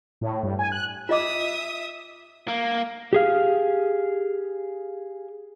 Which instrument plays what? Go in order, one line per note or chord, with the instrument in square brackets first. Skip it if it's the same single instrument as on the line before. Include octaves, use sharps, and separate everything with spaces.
[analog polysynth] A2
G2
G#5
F#6
[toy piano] F4 D#5 D6 [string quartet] E5 D#6
[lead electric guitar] A#3
[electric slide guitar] G4 G#4 F5